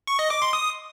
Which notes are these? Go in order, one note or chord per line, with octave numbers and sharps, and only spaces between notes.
C#6
D#5
D6
C6
D#6